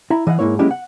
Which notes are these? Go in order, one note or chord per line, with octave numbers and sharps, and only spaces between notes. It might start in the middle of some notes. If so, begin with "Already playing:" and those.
E4 E5 A#5 B5
E3 D#5 F5 F#5
G#2 E3 A#3 E4 C#5
F#3 G#3 A#3 C#4 E4 G4
F#5